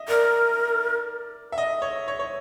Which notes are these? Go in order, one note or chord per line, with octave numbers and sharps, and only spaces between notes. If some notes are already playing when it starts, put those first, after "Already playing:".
Already playing: D#5 E5
A#4 D5
E5
D#5
C#5
C#5
C#5